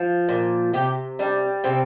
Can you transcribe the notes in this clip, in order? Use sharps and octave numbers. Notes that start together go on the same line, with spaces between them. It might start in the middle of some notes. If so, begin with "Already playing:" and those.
Already playing: F3
A#2
C3 G4
G3 D4
C3 C4